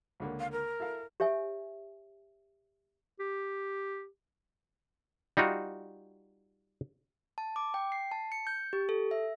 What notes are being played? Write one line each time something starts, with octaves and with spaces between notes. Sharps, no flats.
C#2 D3 A#3
F5
A#4
E4 A4 F5
G4 C#5 E5 G#5
G4
G3 D#4 F4 F#4
A5
D6
G5
C7
A5
C#7
G6
G4
A4
E5